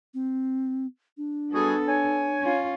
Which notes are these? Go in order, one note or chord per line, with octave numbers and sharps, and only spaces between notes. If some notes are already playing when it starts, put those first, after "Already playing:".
C4
D4
G3 B3 F#4 G#4 A4
C#5 G#5
C#4 F4